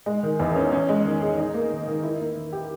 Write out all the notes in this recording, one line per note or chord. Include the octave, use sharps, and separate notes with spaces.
G#3
D#3
E2
C#4
C#4
G#3
D#3
G#4
D#4
A#3
D#3
D#3
E4
A#3
D#3
G4